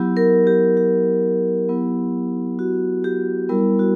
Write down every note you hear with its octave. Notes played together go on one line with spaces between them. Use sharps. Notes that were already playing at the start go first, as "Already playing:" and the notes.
Already playing: F#3 B3 E4 G4
A#4
G4
G4
F#3 B3 E4
F#4
G4
G3 B3 E4 A#4
F#4